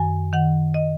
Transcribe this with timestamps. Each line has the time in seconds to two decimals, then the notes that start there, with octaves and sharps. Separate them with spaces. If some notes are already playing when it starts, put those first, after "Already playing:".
Already playing: F#2 D#3 G#5
0.33 D#3 F#5
0.74 D#5